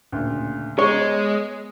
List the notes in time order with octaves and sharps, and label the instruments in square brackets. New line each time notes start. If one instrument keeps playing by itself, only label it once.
[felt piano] D2 A#2 C#3
[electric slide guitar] G#3 [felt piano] B3 A#5 [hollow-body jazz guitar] C#5